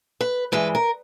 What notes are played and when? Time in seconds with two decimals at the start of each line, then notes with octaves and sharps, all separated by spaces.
0.21 B4
0.52 G2 E3 G#3 B4
0.75 A#4